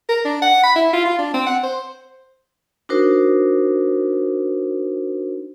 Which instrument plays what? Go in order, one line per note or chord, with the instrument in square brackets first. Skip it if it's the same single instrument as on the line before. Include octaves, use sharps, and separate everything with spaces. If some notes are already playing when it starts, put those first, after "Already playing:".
[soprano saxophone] A#4
D4
F#5
B5
E4
F4
F4
D4
C4
F#5
C5
[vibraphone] D4 D#4 F#4 A#4 C5